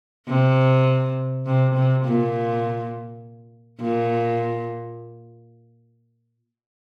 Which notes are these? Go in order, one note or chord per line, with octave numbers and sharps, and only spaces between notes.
C3
C3
C3
A#2
A#2